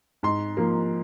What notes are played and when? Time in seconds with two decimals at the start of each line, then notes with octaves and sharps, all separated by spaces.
0.23 G#2 C6
0.57 F3 A#3